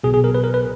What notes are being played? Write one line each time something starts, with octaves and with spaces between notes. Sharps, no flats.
B1 B2 G#4
G#4
A#4
B4
A#4
B4